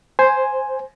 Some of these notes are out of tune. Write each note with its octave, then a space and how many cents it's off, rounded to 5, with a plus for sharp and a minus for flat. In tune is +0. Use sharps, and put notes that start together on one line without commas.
C5 +0 G#5 +0